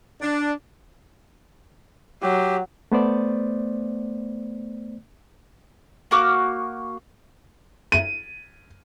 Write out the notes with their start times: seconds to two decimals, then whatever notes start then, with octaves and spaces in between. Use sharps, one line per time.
0.22 D4
2.22 F#3 G4
2.92 A3 B3 C5 D5
6.11 A#3 F#4 D6 F6
7.92 D#7